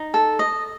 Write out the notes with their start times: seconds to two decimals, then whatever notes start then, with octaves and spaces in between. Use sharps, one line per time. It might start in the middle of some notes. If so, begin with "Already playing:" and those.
Already playing: D#4
0.14 A4
0.39 D#5